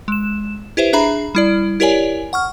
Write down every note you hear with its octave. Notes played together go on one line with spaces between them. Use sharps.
G#3 E7
E4 G4 B4 C5 E5
D4 G#4 E5 A#5 B5
G3 E4 D5
E4 G4 A#4 C#5 D5 G#5
F#5 C#6 F6